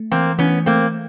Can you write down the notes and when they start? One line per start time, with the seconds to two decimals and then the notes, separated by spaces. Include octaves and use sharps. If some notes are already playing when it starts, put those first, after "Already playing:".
Already playing: A3
0.12 E3 A#3 C4
0.39 E3 B3 C#4
0.66 A3 A#3 C4